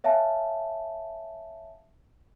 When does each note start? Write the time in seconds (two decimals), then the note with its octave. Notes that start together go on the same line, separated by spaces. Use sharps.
0.04 C#5 E5 F5 G#5 A5